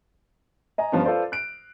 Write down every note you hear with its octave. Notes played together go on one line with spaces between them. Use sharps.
D#5 G#5 A#5
G2 F3 B3 C#4
F4 A4 B4 C5 D5
F#6 D7